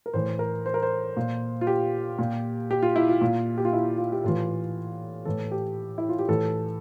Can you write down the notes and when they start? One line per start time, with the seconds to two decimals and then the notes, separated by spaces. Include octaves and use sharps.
0.06 A#4
0.14 A2 E3 C5
0.39 A#4
0.66 C5
0.74 A#4
0.82 C5
1.17 A#2
1.61 F4
1.67 G4
2.19 A#2
2.71 G4
2.82 F4
2.96 E4
3.09 F4
3.21 A#2
3.58 G4
3.65 F4
3.73 E4
3.98 F4
4.12 G4
4.24 A2 E3 F4
5.25 A2 E3 A4
5.52 G4
5.98 E4
6.09 F4
6.19 G4
6.29 A2 E3 A4